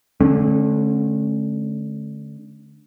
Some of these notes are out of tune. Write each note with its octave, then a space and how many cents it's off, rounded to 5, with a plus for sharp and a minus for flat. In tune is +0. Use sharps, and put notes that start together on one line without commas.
D3 -5 A3 -40 C#4 -35